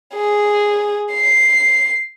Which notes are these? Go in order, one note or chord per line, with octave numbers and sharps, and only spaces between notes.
G#4
C7